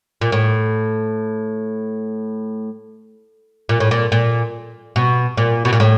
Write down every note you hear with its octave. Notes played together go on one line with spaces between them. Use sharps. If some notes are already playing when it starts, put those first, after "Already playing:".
A#2
A2
A#2
A2
A#2
A#2
B2
A#2
B2
A#2
A2